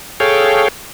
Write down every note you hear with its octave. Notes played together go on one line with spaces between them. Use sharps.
G#4 A4 C#5 F5 G5